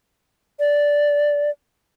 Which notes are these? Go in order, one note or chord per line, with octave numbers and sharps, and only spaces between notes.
D5